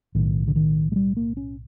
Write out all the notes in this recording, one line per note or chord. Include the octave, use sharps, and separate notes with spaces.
B1 A2 D#3
D3
D#3
G#3
G3
A#3
C#4